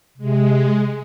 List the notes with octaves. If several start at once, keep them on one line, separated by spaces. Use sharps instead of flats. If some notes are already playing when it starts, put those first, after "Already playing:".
C3 G#3